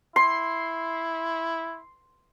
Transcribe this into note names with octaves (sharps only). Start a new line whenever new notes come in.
E4 C6